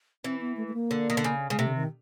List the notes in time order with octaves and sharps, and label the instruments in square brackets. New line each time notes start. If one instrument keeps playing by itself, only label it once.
[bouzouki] E3 [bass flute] C4
[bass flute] B3
A3
A3
A#3
[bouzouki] D3
D#3
D3
C#3
[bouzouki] C#3 [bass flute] G#3
[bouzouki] C3 [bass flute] A3
[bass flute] D3
D#3